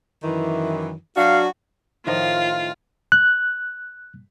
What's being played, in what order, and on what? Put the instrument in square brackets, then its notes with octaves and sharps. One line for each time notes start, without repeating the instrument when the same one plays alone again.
[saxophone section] F#2 D#3 E3
[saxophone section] F#3 D4 F#4 [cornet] F5
[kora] A2 D#3 F3 [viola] F4
[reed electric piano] F#6